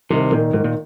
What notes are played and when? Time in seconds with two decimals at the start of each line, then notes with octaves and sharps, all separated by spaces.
0.10 C2 C3 D#3
0.32 A#2 D#3
0.53 G#2 D#3
0.64 A#2